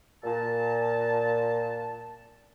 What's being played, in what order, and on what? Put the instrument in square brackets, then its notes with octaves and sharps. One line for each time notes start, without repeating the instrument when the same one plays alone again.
[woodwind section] A#2 A5